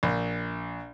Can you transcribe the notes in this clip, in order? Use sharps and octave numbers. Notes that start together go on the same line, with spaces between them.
A#1